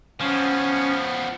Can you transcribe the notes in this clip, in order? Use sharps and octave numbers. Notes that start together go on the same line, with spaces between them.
F3 B3 C#4